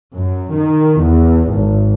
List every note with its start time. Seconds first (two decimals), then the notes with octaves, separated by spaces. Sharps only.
0.17 F#2
0.54 D#3
1.01 E2
1.52 G#1